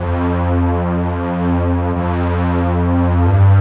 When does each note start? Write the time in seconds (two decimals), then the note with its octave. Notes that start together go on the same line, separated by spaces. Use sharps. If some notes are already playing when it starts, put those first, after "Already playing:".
Already playing: F2
1.96 F2
3.27 G2